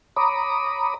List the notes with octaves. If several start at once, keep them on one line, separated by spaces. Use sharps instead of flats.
C#5 A#5 B5 D6 D#6